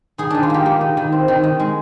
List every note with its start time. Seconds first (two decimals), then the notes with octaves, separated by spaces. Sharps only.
0.18 D#3 G#4
0.30 D#3 D4
0.43 F4
0.50 A#3 G4
0.66 A#3
0.81 D#3
0.97 D#3
1.12 C4
1.28 D#3
1.43 D#3
1.60 G#3